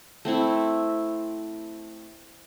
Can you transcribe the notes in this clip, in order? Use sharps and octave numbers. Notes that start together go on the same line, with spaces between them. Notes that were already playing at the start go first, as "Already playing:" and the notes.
A3 C4 E4